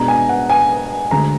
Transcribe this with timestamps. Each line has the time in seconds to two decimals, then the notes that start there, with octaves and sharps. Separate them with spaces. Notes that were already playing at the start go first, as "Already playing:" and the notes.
Already playing: B2 G#3 D4 A#5
0.08 G#5
0.29 F#5
0.50 G#5
1.11 D2 D3 G#3 A#5